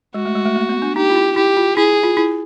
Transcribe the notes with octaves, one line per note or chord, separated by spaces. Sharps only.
G#3 F#4
A3
G#3
A3
A#3
B3
D4
D#4 G4
F4
E4
E4 G4
F4
E4 G#4
F4
E4